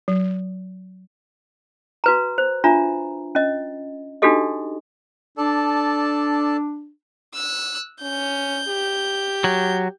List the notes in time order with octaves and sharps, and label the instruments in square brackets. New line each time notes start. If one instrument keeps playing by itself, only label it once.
[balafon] F#3
[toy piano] F#4 B4 A#5
C5
D4 F4 E5 A#5
C#4 D#5
D4 D#4 F#4 G4 A4 D#5
[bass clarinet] D4 [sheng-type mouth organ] A4 D5 A5
[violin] E6 F#6
[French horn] C#4 [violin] G6
[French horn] G4
[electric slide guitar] F#3